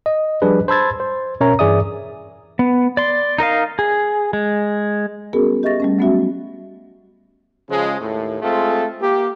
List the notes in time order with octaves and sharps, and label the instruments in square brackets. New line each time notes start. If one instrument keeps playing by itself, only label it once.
[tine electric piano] D#5
F3 G3 D4 G#4 B4
C5 A5 B5 E6 G#6 A6
C5
B2 C#4 A#4 C#5 E5 A#5
G2 E3 G#4 D5 E5 D#6
[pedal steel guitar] B3
D5 C6
D#4 A#4 D#5 F5
G#4
G#3
[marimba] G3 B3 C#4 F#4 G#4 A#4
G4 D#5 E5 C#6 A6 A#6
G3 A3 C#4
F#3 A3 B3 C#4 F#4 E5
[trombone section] C#3 F3 G#3
D#2 A2
G#3 A3 C4 F4 G#4 A4
A#3 G4